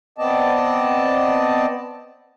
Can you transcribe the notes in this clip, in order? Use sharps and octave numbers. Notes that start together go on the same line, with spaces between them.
B3 C4 D5 D#5 A5